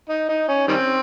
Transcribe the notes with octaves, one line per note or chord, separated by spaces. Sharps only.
D#4
D#4
C#4
D#3 G3 C4